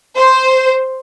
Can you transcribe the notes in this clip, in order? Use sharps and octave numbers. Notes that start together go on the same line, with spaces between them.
C5